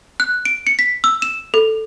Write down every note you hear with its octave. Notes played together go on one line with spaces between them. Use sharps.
F#6
D7
C#7
B6
E6
E7
A4